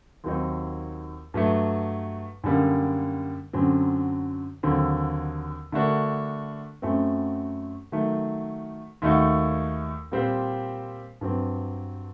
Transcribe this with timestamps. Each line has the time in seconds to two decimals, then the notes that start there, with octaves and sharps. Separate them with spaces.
0.24 D#2 D#3 F#3 C4 D#4
1.34 G2 F#3 A3
2.44 F#2 D3 G3 A#3
3.53 F#2 D3 F#3 C4
4.63 D#2 D3 F#3 C4
5.72 D3 A3 D4 F#4 A#4
6.82 F#2 F#3 A3 C4
7.92 D#3 F#3 A3
9.02 D#2 D#3 A3 D#4 F#4
10.12 A#2 G3 C4 G4 C5
11.21 G2 F#3 C4